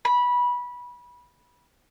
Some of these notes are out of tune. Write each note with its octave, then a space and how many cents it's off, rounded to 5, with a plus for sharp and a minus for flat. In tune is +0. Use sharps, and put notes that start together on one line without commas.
B5 -20